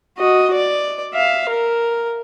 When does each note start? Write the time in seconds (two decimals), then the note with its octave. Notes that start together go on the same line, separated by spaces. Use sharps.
0.18 F#4 D#5
0.54 D5
1.14 E5 F5
1.49 A#4